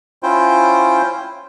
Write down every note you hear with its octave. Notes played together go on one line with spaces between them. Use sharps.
C#4 E4 F4 C5 G5